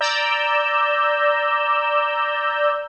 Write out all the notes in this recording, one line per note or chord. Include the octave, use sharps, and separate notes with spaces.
D5 A#5 E6 G6